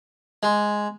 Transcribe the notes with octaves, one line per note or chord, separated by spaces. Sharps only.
G#3